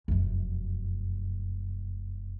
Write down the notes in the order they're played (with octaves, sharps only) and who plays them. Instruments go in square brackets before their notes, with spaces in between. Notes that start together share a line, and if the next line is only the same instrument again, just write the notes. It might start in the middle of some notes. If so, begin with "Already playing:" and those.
[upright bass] F1 F#2